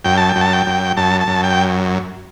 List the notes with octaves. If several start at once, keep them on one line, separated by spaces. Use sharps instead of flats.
F#2 G5
A5
G5
F#2
A5
G5
F#2
F#2 A5
A5
F#2
G5